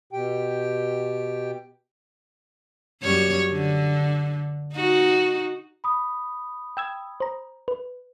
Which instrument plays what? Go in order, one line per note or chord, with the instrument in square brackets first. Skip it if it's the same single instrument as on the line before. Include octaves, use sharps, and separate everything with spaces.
[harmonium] B2 G4 G5
[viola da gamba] F#2 G3 C#5
D3
D#4 F#4
[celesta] B5 D#6
[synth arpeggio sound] G5 E6 G#6
C5 A#5
B4